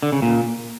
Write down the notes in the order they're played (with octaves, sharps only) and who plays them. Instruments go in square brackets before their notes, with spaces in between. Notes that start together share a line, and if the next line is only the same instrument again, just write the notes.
[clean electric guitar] D3
C#3
A#2